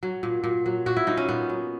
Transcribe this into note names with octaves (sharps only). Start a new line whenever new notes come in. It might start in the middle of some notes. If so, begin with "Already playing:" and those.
F#3
A#2
A#2
F#3
A#2 F#4
E4
A#2 D#4
C#4
A#2 B3
F#3